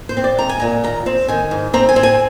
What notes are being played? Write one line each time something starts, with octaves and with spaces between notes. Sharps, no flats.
C5
C4
D5
G#3 A#5
G#5
A#2 A#5
D#2 A#5
C4
D#3 G#5
G#2
C4 A#5
G#5
C4
G#5